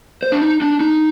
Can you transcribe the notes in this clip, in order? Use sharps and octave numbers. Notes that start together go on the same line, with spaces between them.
C5
D4
D#4
D4
D#4